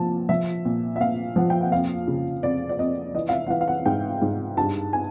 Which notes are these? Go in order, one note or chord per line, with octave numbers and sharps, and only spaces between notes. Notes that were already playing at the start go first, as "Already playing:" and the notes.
Already playing: A#2 F3 A5
F3 E5
A#2
E5
A#2 F5
F3 F#5
G5
F#5
F2 F5
C#3
F2 D5
D5
F2 D#5
E3 D#5
F5
E5
F#5
E3 F5
F5
F#5
G#2 G5
G#2
G2 A5
G#5